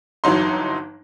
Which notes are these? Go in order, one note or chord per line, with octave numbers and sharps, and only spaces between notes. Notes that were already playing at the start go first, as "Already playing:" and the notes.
G1 E3 F#3 D#4 C6